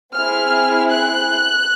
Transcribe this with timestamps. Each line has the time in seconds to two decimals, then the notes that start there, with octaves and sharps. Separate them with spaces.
0.16 C4 E4 G#4 F6
0.90 F#6